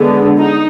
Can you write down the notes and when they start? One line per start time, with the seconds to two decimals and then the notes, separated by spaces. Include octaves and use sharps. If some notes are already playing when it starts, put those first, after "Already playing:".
Already playing: D3 G#3 B3
0.39 D#4